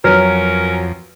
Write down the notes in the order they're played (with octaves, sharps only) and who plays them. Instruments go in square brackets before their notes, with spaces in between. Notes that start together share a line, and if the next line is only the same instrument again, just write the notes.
[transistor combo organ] F2 [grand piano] F#3 [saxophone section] C#4 A#4 [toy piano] B4